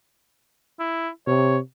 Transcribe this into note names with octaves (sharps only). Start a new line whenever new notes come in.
E4
C3 C#5